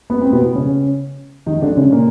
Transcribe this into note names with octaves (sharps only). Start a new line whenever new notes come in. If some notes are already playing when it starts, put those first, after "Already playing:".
B3
C4
B2 B3
C#3 C#4
D#3 D#4
D3 D4
C#3 C#4
A#2 A#3